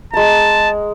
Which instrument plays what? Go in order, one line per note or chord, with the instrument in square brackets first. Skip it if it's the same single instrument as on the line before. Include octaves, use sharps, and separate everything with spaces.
[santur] G#3 A#5 [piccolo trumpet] A5